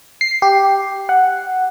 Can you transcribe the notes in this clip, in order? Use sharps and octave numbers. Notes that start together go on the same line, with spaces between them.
C7
G4
F#5